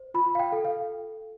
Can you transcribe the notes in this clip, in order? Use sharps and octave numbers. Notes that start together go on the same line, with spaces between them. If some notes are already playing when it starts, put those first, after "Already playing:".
Already playing: C5
F4 B5
F5
G5
A4
F5